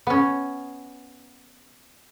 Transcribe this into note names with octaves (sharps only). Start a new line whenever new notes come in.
B3 C#4